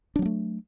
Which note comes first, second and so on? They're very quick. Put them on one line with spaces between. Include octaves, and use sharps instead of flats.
D4 F#3 B3 A3